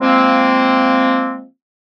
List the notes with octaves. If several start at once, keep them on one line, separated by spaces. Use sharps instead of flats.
F3 G#3 A#3 C4